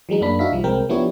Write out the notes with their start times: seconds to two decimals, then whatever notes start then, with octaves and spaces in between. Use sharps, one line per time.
0.09 E3 F#3 G#3 D#4
0.21 F#2 A#3 D4 B5
0.39 D4 D#4 F#4 E5 F5 B6
0.52 C2 F3 G3
0.64 C2 G#3 C4 A#4 G5
0.89 F3 B3 D4 E4 G4 C#5